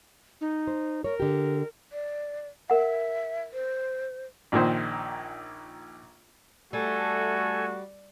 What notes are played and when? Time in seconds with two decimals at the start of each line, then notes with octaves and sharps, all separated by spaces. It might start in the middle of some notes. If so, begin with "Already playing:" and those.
0.41 D#4
0.67 C5
1.04 A#4 C#5
1.20 D3 G4
1.92 D5
2.70 A#4 E5 F#5
3.53 C5
4.52 A#1 A#2 D#3 C5
6.73 G3 A3 F#4 A4 G#5